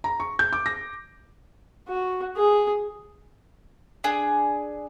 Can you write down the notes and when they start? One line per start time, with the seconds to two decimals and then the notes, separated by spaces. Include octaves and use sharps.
0.04 A#5
0.20 C#6
0.39 G6
0.53 D6
0.66 A#6
1.89 F#4
2.37 G#4
4.04 D4 G#4